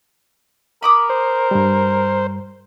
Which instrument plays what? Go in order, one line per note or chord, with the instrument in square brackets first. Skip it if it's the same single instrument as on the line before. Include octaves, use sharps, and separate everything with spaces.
[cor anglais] A#4 [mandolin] B5 D6 D#6
[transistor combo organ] C5
[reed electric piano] G2 G3